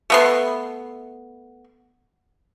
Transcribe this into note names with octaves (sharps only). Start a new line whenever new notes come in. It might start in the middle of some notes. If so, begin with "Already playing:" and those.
A3 B3 C6